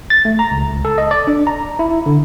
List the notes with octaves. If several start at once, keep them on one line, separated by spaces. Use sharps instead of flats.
A6
A3
A#5
C#2
A4
D#5
D5
D4
A#5
E4
D3